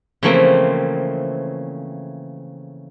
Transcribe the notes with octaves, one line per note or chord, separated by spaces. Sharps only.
C#3 E3 F3 A3 A#3 C4